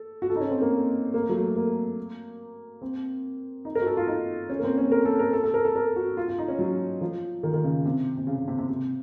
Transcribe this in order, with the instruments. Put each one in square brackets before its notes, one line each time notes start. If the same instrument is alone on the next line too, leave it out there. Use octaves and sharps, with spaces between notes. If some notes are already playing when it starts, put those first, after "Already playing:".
Already playing: [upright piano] A4
F#4
A4
D#4
C#4
C4
A#3
A#3
A3
F#3
A3
A#3
C4
D#4
A#4
F#4
A4
F4
D#4
C#4
A#3
C4
C#4
A#4
A4
A#4
A4
A4
A#4
A4
A#4
F#4
F4
F4
D#4
C#4
F#3
F3
D#3
D#3
C#3
C3
C3
C#3
C#3
C3
C3
C3